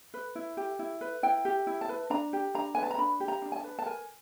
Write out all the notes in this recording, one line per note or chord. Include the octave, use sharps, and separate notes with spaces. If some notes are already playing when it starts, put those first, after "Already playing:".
B4
E4
G4
E4
B4
E4 G5
G4
E4
A5
B4
D4 A#5
G4
D4 A#5
B4 G#5
A5
A#5
D4 B5
G4
A#5
D4
G#5
A5
B4
A5
A#4 G#5